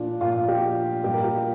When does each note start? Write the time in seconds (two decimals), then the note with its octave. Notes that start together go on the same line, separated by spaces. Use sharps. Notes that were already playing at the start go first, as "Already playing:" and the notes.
Already playing: A#2 F3 D4
0.21 A#2 F3 F4
0.48 G4
1.04 A#2 G3 G4
1.14 A#4
1.24 G4